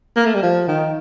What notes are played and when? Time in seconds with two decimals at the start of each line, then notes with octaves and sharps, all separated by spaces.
0.17 A#3
0.26 A3
0.34 G3
0.43 F3
0.68 D#3